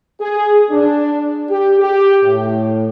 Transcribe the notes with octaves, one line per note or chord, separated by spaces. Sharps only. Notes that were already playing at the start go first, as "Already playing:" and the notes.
G#4
D4
G4
G4
A2